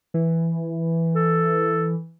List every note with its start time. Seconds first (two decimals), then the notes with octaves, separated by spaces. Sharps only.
0.14 E3
1.15 A4